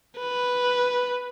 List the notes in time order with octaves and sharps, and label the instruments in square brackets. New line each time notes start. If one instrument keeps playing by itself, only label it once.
[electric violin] B4